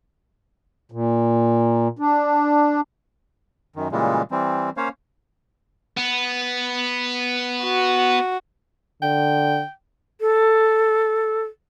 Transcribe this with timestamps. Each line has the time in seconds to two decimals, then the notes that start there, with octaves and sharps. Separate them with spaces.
0.92 A#2
1.99 D4
3.76 F#2 D#3
3.92 A#2 C#3 E3 G3 G#3
4.31 E3 G3 C4
4.77 A#3 C#4 C5 C#5 F5
5.97 B3
7.64 F#4
9.02 D3 G5
10.21 A4